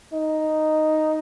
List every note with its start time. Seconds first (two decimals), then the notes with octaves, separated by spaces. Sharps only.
0.13 D#4